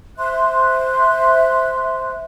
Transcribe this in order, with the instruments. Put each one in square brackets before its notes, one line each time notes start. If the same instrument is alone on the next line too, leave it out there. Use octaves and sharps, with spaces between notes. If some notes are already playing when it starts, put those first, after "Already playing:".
[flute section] C5 E5 C6 F#6